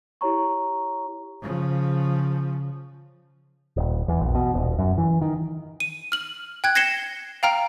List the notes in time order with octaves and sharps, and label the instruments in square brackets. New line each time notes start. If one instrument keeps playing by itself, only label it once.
[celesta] E4 G4 C#5 A#5 C#6
[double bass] C#3 F3
[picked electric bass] D#1
E2
A#1
B2
D#1
F#2
E3
D#3
[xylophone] D#7
F6 F#7
G5 F#6 G#6
G#6 A#6 C7 C#7 E7 G7
F5 G5 A#5 F6 D7